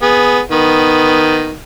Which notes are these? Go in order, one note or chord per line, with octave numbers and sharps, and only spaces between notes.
B3 G#4
D#3 B3